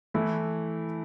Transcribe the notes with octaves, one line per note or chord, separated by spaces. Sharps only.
E3 A3 E4